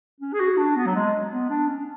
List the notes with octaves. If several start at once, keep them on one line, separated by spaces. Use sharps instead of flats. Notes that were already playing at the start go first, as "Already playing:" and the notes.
C#4
G#4
F#4
D4
B3
F#3
G#3
B3
D4
C#4